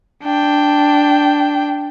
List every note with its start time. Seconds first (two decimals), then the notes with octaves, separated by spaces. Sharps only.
0.24 D4 G5